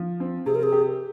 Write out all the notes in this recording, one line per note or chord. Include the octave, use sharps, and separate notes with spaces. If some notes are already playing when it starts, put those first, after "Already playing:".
Already playing: F3
C4
C3 G#4
A#4
G#4
G4